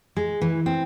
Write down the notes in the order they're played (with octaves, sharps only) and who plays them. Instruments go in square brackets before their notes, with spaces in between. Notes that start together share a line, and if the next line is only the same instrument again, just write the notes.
[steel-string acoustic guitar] G#3
E3
C4